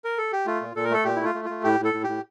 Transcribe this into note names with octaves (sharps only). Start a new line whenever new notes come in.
A#4
A4
G4
A3 F4
A#2
A#2 A4
A#4
A3 A4
A#2 G4
E4
A3 F4
A3
A3 F4
A2 G4
A2
A4
A2
A2 G4